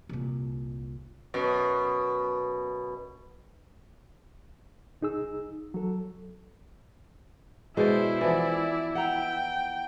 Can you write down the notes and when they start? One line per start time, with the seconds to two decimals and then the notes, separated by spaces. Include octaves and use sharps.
0.09 C2 A#2
1.34 F#2 B2
5.01 C2 D#4 G#4 E6
5.74 F#3 A4
7.77 B2 G#3 E4 C5 D5
8.21 E3 F3 B3 D5
8.95 F#5 G5 A#5